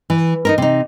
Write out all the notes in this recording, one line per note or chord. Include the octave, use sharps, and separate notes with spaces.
E3
D#4 E4 A#4
C3 D#4